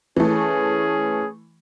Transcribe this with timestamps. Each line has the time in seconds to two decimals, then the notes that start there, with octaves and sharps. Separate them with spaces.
0.16 E3 A3 C#4 G#4